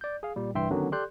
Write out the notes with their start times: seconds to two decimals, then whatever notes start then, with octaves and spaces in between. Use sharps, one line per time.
0.01 D5 G6
0.23 G#4 F5
0.36 A#2 G3
0.55 C2 G2 E3 E5 G5 C6
0.71 D3 D#3 F#3 B3 C#4
0.92 G4 A4 D5 C6 F#6 G6